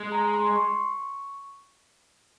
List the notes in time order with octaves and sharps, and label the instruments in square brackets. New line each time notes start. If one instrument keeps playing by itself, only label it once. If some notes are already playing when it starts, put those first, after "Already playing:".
Already playing: [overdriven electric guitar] G#3
[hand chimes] A#5
C6
C6
C#6